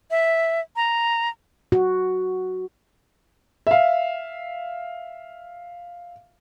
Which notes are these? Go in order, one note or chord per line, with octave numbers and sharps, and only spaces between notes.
E5
A#5
F#4
E5 F5